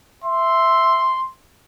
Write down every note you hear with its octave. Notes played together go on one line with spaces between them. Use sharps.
E5 C6